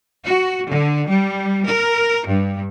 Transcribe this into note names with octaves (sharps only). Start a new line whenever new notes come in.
F#4
D3
G3
A#4
G2